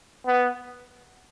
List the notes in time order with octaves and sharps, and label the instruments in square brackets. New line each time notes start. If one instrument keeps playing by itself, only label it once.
[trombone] B3